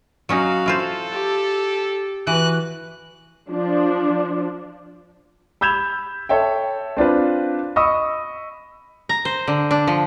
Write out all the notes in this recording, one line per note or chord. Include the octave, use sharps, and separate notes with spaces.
F#3 C#4 D#4 F#4 F5
E4 F4 A4 C5
G4
E3 F#4 B4 F#6
F3 D4
B5 E6 G6 G#6 E7 F7
A4 C#5 E5 G5
C4 D4 F4 B4
D#5 B5 C#6 D#6 E6
A#5
C5
D3
D4
F3